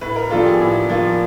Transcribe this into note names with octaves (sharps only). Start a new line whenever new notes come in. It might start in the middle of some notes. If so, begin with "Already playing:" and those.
A2 B4
A#4
F3 A#3 D4 F4 A4
G4
G#4
A2
F3 A#3 D4 F4